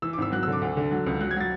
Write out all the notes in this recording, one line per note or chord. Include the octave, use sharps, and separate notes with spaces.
E3 E6
D6
G#1 E6
F#3 F#6
E6
D3
D6
D2
D3
F#3
C#2
F#3 F#6
G#6
F#3 A6